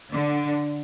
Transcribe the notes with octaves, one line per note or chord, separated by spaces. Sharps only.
D3